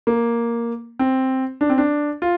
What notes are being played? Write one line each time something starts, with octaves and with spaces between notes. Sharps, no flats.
A#3
C4
D4
C4
D4
F4